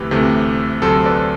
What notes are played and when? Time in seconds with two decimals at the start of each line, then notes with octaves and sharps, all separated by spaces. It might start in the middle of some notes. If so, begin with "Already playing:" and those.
Already playing: D2 C3 E3 A3 G4 B4
0.11 D2 C3 E3 A3
0.82 D2 C3 F#3 A4 C5
1.06 B4 D5